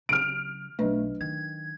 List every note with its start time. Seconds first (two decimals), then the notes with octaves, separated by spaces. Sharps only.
0.09 C#3 F#3 F6 D7
0.79 B1 F#3 A3 D4 B4
1.21 D#3 G#6